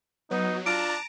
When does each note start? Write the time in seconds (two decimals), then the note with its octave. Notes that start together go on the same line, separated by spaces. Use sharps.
0.31 F#3 B3 D#4
0.66 D4 F4 A5 A#5 D7